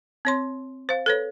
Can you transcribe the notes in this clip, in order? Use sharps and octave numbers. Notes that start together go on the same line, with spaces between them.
C4 C#5 C6
C5 F5
A4 B4 C#5